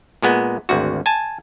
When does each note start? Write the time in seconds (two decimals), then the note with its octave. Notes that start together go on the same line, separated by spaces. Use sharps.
0.22 A#2 G#3 B3
0.69 G#1 D2 F#4
1.06 G#5 A5